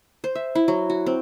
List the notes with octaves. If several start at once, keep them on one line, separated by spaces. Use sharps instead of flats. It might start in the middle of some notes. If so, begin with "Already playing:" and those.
C5
E5
E4
F#3
F#4
C4